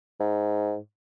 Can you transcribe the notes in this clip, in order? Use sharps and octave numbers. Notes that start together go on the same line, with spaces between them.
G#2